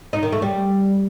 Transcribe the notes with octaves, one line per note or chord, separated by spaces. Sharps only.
D#4
D#3
A3
G3